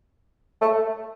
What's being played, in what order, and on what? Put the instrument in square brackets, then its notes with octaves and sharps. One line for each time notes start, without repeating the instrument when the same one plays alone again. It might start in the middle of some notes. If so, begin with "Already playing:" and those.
[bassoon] A3